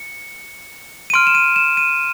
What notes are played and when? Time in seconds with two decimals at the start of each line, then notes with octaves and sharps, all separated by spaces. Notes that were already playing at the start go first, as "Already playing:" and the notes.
Already playing: C#7
1.10 D#7
1.14 C6 F6 D7
1.27 E7
1.35 D#7
1.56 E7
1.77 D#7